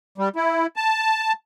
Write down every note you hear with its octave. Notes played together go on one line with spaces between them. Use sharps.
G3
E4
A5